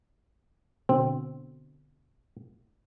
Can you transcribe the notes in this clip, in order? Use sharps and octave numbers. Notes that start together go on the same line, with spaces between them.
B2 D3 C4